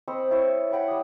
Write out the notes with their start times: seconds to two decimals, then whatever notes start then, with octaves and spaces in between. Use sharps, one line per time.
0.08 C4 D#5 B5 C#6
0.31 E4 C5 C#5
0.48 C#5
0.71 F#5 G5 B5 C#6
0.88 G3 D#6